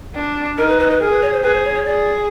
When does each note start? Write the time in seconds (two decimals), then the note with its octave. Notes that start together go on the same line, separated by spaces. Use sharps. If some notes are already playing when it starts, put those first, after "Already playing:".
0.15 D4
0.58 D#4 A#4
0.69 B4
0.79 B4
0.90 B4
1.00 G#4 A#4
1.11 B4
1.22 C#5
1.32 C5
1.43 G#4 B4
1.53 C5
1.65 C#5
1.75 C#5
1.85 G#4 D5